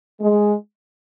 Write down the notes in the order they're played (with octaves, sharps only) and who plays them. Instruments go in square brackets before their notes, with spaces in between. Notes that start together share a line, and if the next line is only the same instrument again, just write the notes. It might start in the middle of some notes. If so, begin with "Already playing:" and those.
[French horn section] G#3